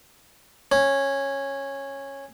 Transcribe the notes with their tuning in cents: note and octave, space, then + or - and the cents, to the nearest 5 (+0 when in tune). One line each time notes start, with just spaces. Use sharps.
C#4 -10